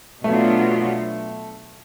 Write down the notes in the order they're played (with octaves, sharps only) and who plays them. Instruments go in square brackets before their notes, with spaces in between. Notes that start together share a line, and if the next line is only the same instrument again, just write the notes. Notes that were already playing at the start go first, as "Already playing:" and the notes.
[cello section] B2 F#3 B3 D4 F4 [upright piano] A3